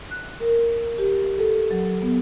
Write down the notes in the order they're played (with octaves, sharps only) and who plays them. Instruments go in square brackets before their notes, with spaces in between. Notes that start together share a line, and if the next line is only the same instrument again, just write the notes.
[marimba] F#6
A#4
G4
A4
F#3
B3